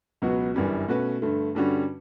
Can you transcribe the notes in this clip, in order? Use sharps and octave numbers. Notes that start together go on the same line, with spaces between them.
C#2 B2 F#3 B3 F#4
G1 F#2 E3 G3 C#4
B2 A3 C#4 F#4 B4
G2 D3 A3
G2 D3 G3 C#4 F#4